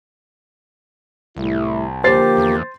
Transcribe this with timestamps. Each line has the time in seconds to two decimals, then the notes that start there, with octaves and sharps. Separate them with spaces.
1.37 C2 A2 G3 E4
2.04 D3 F3 A#3 G4 C5 A6 C7
2.37 E2